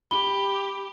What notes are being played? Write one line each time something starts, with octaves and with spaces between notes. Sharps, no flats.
G4 B5 G7